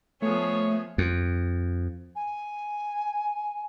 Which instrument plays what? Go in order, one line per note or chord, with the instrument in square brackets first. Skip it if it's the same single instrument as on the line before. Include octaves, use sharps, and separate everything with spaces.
[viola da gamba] F3 B3 G#4 [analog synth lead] A3 [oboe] C#5
[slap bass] F2
[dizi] G#5